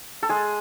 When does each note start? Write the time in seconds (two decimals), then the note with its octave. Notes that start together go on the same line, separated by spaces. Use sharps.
0.23 A4
0.29 G#3 G#4